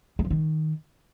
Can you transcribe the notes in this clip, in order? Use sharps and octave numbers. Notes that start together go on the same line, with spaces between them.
G#3
F3
D#3